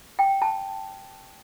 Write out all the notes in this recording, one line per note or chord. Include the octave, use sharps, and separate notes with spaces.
G5
A5